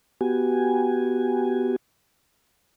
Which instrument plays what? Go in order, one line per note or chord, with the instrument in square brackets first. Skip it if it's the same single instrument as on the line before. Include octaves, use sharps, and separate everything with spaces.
[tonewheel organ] B3 F#4 G4 G#5